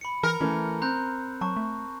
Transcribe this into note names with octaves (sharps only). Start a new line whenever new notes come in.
B5 C#7
E3 A#4
E3 A3 C#4
C4 A#5 F#6 G6
F#3 A5 C#6
A3